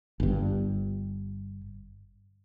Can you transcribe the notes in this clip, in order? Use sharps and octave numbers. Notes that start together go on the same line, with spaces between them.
G1 G2